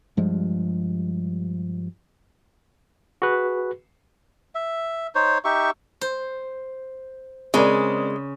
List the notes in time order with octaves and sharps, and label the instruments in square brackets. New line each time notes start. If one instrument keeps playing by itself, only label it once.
[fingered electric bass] G2 F3 G3 G#3
[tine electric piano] F#4 G#4 B4
[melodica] E5
D#4 C5 C#5
D#4 G4 E5 C#6
[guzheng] C5
[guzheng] C#3 [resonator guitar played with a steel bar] G#3 [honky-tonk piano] C4 A#4 D5